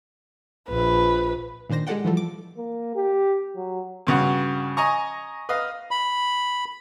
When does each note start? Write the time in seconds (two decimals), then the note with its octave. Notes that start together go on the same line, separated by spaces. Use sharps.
0.69 A#1 B4
1.69 A#2 D#3 D4 C5 A#6
1.87 G#3 G4 A4 D5 F#5 G5
2.05 E3 F3 G3 A3
2.17 D6
2.57 A#3
2.95 G4
3.56 F#3
4.07 G2 C#3 F#4 F#5
4.77 D#5 G#5 A#5 C#6
5.49 B4 D#5 F5
5.91 B5